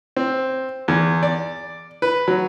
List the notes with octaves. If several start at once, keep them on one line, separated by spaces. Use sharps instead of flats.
C4
E2
D5
B4
F#3